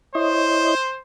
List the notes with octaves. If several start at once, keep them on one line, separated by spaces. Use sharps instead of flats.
E4 C5 C#5 D#5